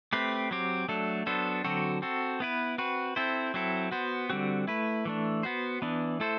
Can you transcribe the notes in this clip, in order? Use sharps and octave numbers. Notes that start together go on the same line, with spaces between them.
A3 C4 G4 B4
F#3 C4 G4
F#3 A3 D4 A4
F#3 B3 D4 A4 C5
D3 F#3 C4 F#4 A4
C4 F#4 A4
B3 E4 B4
C4 F#4 B4
C4 E4 A4 C5
F#3 C4 E4 A4
B3 F#4 C5
D3 G3 C4 F#4
A3 E4 B4
E3 A3 D4
B3 F#4 C5
E3 B3 D4
A3 E4 A4 C5